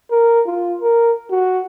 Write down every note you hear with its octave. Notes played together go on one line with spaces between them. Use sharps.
A#4
F4
A#4
F#4